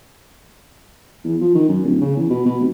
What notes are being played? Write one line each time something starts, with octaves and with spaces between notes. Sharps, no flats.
E2
F3
D#3
F#2
D1
C#3
E2
B2
B2
F1